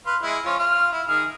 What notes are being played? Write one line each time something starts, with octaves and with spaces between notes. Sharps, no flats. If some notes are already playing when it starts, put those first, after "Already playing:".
B4 F5 C6
G#3 E4
F3 C#4 F4
F4 F6
E4
D#3 G#4 F6